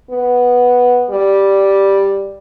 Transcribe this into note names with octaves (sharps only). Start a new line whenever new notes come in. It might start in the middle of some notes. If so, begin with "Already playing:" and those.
B3
G3